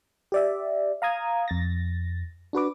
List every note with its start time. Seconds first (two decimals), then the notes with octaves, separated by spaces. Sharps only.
0.32 G4 D5 E5
1.02 F5 A#5 D#6 G#6
1.48 F2 A6 A#6
2.53 D4 F#4 B4 D6